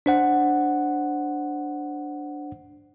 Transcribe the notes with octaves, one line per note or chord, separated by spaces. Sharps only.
D4 C5 F#5